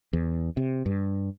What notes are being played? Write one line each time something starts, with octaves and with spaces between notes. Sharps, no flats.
E2
C3
G2